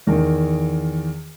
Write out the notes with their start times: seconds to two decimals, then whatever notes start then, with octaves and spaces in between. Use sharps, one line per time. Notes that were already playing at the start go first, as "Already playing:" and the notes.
0.07 E2 D#3